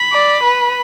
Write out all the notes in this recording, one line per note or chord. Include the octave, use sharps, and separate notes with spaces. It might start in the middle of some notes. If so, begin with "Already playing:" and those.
Already playing: B5
D5
B4